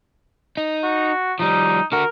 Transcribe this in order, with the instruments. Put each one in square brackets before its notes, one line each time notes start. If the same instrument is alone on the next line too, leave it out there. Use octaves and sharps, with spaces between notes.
[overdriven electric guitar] D#4
[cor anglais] F#4
[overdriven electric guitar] F3 G3 [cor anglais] D#4
[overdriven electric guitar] D3 F#4 [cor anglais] A#4